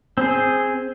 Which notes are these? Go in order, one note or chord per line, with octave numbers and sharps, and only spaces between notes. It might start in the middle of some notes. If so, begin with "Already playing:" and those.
C4 G#4